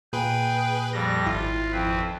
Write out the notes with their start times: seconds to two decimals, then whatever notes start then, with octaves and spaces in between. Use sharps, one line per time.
0.13 A#2 G#4 B4 G5
0.93 F2 G3 A#6
1.26 G#1 E4 F4
1.72 F2 C4 B4